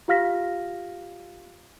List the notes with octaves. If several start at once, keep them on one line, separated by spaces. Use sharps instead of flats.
F4 G4 F5 F6 A#6 B6